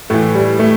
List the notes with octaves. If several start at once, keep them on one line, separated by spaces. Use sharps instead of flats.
A2 E3 A3
G3
A3